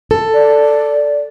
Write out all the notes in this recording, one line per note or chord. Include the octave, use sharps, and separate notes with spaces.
A4
D5